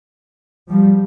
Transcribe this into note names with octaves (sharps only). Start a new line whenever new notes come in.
F3 G3